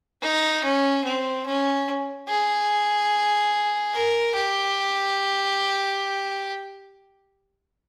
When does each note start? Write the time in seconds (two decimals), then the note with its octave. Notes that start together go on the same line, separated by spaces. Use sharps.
0.22 D#4
0.64 C#4
1.05 C4
1.46 C#4
2.28 G#4
3.93 A#4
4.35 G4